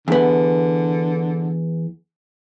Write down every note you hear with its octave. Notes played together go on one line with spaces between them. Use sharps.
E2 D3 B3